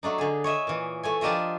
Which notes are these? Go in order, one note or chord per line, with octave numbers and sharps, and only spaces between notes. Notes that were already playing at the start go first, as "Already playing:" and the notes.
F#3 A3 D4 D#4
D3 G#4
C#5 D#5 E5
A#2 E3
A3 C#5 G#5
F3 D4 G4 A#4 D#5 E5